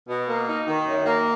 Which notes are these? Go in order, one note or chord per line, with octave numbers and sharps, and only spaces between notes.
B2
A#3
D#4
D#3
F#2
A#3